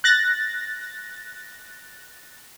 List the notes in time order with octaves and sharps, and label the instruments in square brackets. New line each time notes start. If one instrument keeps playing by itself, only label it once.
[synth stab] F#6 A6 A#6